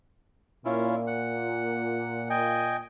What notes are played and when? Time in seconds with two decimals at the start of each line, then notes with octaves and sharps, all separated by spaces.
0.65 A#2 C#4 E4 F4
1.07 F#5
2.30 D#5 G5 G#5